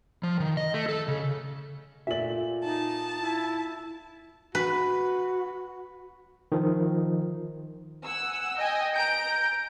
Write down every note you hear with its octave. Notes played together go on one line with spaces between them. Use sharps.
F3
D#3
D#5
A3
A4
C#3
A#2 A3 D5 E5 F#7
D#4 A5
E4
F#4 B4
D#3 F3
F#5 G#5 E6
D#5 G5 G#5
A#5 G6 D7